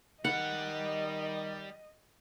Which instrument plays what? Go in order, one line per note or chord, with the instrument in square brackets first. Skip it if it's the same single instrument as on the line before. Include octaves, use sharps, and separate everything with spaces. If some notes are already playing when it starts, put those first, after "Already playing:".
[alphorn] D#3 [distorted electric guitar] G3 B5 [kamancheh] D#5 [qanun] F#5